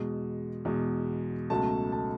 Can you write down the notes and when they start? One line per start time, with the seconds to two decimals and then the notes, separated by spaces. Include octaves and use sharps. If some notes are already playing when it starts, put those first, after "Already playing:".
Already playing: E2 B2 G#3
0.65 E2 B2 G#3
1.50 C#2 B2 F#3 A3 A5
1.92 A5